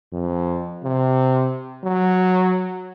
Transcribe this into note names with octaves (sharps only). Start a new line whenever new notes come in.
F2
C3
F#3